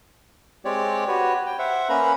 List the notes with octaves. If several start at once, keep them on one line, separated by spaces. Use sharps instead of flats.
G#3 C4 G4 C#5 D5
F#4 G4 B4 C#5
G5
C5 E5 F#5
A#3 C#4 B4 A#5 B5 E6